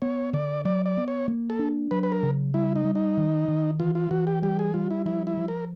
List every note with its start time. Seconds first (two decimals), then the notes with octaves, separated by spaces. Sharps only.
0.02 B3 C#5
0.33 D3 D5
0.65 F#3 D5
0.86 D5
0.97 B3
1.08 C#5
1.28 A#3
1.50 A4
1.59 D4
1.91 F#3 B4
2.03 B4
2.12 A#4
2.23 C#3
2.54 G3 E4
2.76 D#4
2.85 G3
2.95 D#4
3.17 D#3
3.48 D#3
3.80 E3 F4
3.95 F4
4.11 E3 F#4
4.27 G4
4.42 G3 G4
4.59 G#4
4.74 G3 F4
4.91 E4
5.05 F3 E4
5.27 E4
5.37 F3
5.48 A#4